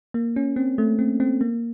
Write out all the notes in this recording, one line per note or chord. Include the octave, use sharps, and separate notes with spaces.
A#3
C#4
C4
A3
C4
C4
A#3